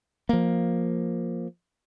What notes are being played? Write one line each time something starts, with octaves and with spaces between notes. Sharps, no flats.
F3 A#3